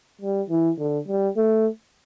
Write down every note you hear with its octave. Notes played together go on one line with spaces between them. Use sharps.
G3
E3
D3
G3
A3